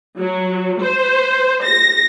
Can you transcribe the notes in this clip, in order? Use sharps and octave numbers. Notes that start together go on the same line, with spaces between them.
F#3
C5
A#6